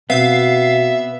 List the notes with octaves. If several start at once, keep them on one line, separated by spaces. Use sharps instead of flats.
B2 B3 C4 E5 F5